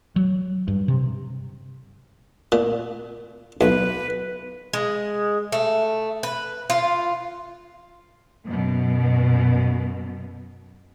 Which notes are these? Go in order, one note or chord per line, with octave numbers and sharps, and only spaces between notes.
F#3
G2
C3
A#2
B1 B4
G#3
A3
B4
F4
F#2 B2